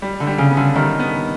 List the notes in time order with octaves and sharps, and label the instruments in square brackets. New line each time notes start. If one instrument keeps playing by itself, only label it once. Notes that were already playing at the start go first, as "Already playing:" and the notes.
[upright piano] G3
[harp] D3
[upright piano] G3
[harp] C#3
[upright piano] B3
[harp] D3
[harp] D#3 [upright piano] G3
[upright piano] B3